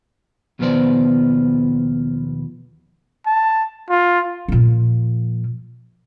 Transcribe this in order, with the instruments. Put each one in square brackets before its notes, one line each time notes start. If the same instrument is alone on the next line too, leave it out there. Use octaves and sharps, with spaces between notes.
[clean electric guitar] D#2 B2 F3 B3 C5 D5
[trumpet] A5
F4
[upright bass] A#2 F3